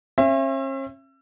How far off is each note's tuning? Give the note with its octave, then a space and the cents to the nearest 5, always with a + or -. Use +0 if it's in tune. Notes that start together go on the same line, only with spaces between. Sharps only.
C#4 -45 E5 +30